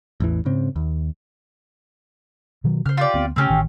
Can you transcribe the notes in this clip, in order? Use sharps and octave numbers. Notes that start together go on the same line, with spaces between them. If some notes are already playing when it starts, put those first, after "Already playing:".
A1 E2 E3
G#2 C#3 C4
D#2
B2 D#3 F#3
C#3 C5 F6
F4 G4 D5
D2 B3 C4
C#3 A3 C4 C#4 G4
A1 D#3